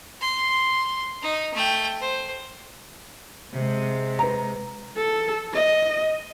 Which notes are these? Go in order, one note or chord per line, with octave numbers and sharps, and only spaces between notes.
C6
D#4
A3 G5
C5
C3 G#3
B4 A#5
A4
D#5